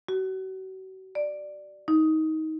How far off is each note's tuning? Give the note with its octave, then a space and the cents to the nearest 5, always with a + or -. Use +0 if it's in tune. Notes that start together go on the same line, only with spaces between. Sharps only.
F#4 +40
D5 +10
D#4 +20